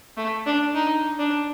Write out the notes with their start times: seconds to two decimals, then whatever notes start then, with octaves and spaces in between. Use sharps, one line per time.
0.17 A3
0.46 D4
0.75 D#4
1.19 D4